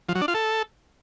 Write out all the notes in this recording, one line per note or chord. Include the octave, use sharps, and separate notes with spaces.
F3
F#3
D4
F4
A4